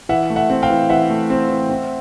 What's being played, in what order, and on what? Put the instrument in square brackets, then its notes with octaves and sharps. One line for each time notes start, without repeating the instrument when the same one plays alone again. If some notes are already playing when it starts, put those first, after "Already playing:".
[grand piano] E3 E5 F#5
A3
E5 F#5
C4
F5 G5
E3
E3 E5 F#5
A3
C4
E3
C4